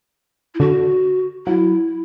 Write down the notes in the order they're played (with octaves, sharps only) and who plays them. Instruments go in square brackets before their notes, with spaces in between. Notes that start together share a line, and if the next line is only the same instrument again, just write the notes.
[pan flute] E4
[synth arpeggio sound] D3 [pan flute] F#4
[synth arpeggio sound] F#3 [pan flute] E4